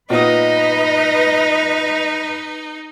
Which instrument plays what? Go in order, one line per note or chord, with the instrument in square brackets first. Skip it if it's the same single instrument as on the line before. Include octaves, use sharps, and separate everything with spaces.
[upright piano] A#2 B3 D#6 [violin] D#4 [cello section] B4 [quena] D#5